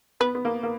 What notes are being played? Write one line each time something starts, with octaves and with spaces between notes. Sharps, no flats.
B3 B4
B3
A#3
A#3